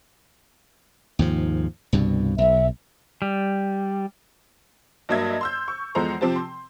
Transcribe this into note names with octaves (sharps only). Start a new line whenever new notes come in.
D#2 G#2 F3
C2 G2 B2
B1 E5
G3
G2 F#3 A#3 D#5 E5 G#6
C6 E6 G6
C#6
E2 F3 G#3 A4 C5 A#5
C3 F3 C4 G4 A5
C6